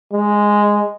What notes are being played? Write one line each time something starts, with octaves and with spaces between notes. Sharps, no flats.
G#3